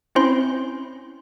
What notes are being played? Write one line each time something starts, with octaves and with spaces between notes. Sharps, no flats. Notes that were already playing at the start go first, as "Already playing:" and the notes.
C4 C#4 E4 C5 C6